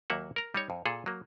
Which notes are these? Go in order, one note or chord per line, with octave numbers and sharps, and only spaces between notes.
D#2 F#3 A#3 E5 F#5
A#4 A#5
G3 D#4 C#5
F2
A#2 G#4 A4
F#3 A#3